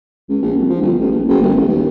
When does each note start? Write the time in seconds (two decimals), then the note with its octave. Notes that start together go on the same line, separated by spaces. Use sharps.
0.29 C#2
0.42 A#1
0.56 C2
0.69 F3
0.82 G1
0.99 A1
1.11 A#1
1.28 F#1
1.42 G1
1.56 A1
1.68 D#2